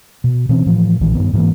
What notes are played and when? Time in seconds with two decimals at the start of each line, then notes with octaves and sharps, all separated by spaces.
0.24 B2
0.49 B2 E3 C4 C#4
0.66 A2 E3 F3
1.01 A#1 A#2 D#3 E3
1.15 G2 D#3 B3
1.33 G#2 E3 G#3 A#3